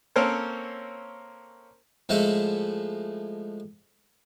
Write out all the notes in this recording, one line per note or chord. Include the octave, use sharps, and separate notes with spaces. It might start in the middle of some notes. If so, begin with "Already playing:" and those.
A#3 C4 C#4 A4 A#4 C5
A2 F3 G#3 A3 A4